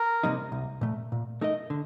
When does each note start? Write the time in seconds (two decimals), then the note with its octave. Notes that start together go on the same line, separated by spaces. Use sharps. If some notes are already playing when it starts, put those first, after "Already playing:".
Already playing: A#4
0.23 C3 G3 A#3 D#4
0.52 C2
0.81 A#2 A3
1.12 A#2
1.41 A3 D#4 A#4 D#5
1.70 D3